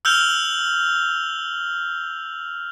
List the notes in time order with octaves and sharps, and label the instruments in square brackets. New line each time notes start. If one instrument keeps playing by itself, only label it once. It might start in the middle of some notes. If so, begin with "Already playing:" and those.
[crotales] E6 F6 G6 F7 G7